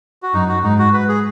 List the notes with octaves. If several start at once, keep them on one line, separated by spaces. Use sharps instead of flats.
F#4
F#2 D#4
F#4
G#2 D#4
F#4
B4
G#4